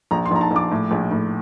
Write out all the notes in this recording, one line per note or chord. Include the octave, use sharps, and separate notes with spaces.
A#1 A#5
C6
A#1 A#5
A5
A#1 D6
A2
A#1
A2